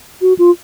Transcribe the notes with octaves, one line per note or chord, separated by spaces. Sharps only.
F#4
F4